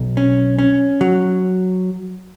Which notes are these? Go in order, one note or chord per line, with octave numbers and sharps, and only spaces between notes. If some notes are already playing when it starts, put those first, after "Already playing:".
Already playing: B1
C#4
C#4
F#3